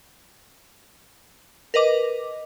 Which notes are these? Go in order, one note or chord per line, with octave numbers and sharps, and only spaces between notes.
A#4 B4 D#5 D6